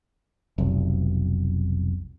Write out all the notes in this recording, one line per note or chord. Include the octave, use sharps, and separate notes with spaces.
F1 B1